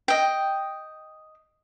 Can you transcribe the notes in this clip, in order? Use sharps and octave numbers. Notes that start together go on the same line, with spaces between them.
D#5 G5